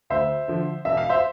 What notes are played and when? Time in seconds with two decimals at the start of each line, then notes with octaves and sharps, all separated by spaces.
0.10 D2 C5 E5
0.48 D3 F3
0.85 E1 E5
0.97 F5
1.09 C5 E5